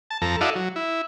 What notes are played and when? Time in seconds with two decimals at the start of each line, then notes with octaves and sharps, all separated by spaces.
0.10 A5
0.22 F2 A4 A#5
0.41 E4 F#4 A4 D5 D#5 F5
0.56 F#3
0.76 E4